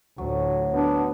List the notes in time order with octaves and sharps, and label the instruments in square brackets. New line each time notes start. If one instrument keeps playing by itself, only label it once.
[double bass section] D2 A2 [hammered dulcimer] F#3
[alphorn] B3 [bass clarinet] D4